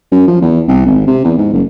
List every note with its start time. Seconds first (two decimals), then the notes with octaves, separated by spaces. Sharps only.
0.12 F#2
0.27 F3
0.41 E2
0.68 C2
0.86 G#1
1.07 C3
1.24 E2
1.38 G#2
1.53 F#1